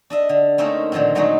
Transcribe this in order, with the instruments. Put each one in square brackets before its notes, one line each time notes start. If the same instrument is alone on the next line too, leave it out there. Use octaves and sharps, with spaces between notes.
[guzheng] D4 D#5 E5
D3
A3 A#3 C4 C#4 D#4 A#4
A#2 D3 D#3 F3 C4
A#2 F#3 G#3 A3 D#4 F#4